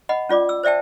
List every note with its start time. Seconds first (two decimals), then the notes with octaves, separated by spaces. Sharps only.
0.09 D#5 F#5 B5
0.29 C#4 F4 D5 D6
0.49 E6
0.63 C5 D5 E5 G5 A5